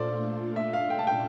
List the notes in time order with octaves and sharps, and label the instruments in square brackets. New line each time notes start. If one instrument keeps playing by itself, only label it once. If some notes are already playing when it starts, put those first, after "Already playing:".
Already playing: [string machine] A#2 A3 D4 F4 [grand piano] A4 C5 D5
[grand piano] E5
F5
G5
A5
G5